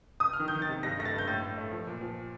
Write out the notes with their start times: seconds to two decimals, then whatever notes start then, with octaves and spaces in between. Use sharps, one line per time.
0.20 D#6
0.33 F6
0.40 D#3
0.48 G6
0.55 D#3
0.62 A6
0.69 C3
0.83 G2 A#6
0.99 A3 A#6
1.05 A6
1.14 G2 G6
1.28 A2 A6
1.43 A2
1.57 A3
1.71 F3
1.87 A#2
2.01 F3